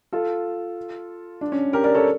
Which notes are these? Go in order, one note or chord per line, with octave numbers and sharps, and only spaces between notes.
F4 A4
D4
C#4
G4 A#4
A#4 D5
A4 C#5